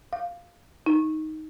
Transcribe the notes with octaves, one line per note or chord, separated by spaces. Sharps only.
F5
D#4